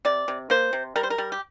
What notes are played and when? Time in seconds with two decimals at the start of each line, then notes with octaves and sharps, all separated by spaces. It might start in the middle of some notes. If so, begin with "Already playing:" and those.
0.05 C3 D5
0.28 C3
0.50 A#3 C5
0.73 C3
0.96 G3 A#4
1.03 C5
1.10 A#4
1.18 G3
1.32 G4